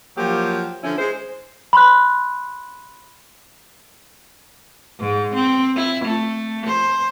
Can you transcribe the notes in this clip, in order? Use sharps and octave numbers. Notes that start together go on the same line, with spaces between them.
F3 F#3 A#3 G4
D3 F3 C#4 E4
G#3 C5
B5 C6 F#6
G#2
C4
E4
A3
C5